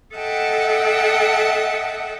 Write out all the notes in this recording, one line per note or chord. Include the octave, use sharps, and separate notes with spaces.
A4 D#5 E5 F#5 G5 A5